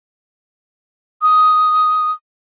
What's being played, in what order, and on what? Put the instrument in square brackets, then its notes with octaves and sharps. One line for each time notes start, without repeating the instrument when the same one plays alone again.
[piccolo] D#6